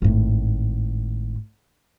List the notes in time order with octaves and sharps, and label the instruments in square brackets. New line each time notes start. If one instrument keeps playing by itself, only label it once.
[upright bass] G#1 A2